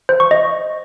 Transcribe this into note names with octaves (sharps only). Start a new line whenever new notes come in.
C5
C#6
D#5